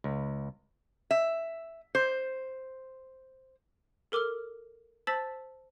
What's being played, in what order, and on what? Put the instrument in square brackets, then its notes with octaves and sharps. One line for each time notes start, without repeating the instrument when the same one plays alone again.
[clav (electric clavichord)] C#2
[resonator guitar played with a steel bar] E5
C5
[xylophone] A4 A#4 D6 E6 F6
C5 A5 E6 A6 B6 F#7